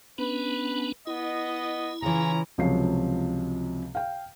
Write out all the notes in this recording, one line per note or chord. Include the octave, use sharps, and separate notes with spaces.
B3 C#4 D4 B4
B3 E4 D#5
C#3 E3 C#4 F4 A#5
C#2 C3 F3 F#3 C#5 C7
F5 G5